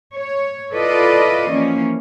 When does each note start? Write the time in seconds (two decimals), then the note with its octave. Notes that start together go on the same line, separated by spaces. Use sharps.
0.14 C#5
0.74 E4 F4 A4 B4 D5 D#5
1.51 E3 F3 A#3 C#4